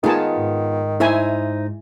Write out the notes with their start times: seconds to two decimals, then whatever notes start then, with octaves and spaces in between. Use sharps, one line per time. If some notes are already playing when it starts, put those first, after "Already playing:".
0.04 D#3 B3 D#4 F4 G#4 A5
0.36 G#2
1.00 D#4 E4 C5 E5 G#5